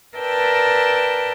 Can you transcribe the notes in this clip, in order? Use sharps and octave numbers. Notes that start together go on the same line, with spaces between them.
A#4 B4 D5 E5 G5 A5